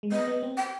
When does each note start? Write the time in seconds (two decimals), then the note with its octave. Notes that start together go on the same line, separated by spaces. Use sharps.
0.03 G#3
0.12 B3 D#5
0.27 B3
0.43 C4
0.57 G5